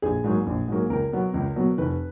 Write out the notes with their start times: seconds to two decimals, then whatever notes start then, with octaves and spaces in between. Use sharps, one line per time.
0.02 A#1 G#4
0.24 G#2 F#3 A#3
0.46 A#1
0.68 G#2 F#3 A#3
0.90 C#2 A#4
1.12 B2 F#3 B3
1.34 C#2
1.56 B2 F#3 B3
1.78 F1 B4